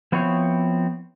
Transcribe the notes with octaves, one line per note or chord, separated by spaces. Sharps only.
F3 B3 C4 E4 C#5